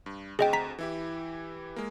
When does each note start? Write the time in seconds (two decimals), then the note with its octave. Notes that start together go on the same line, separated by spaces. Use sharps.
0.06 G2
0.39 D2 C4 G#4 D#5 G5
0.53 A#5 B6
0.79 E3 E4 G4
1.76 G#3 A#3